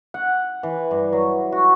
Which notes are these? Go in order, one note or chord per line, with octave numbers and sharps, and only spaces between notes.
F#5
E3
G2
F#3
F#4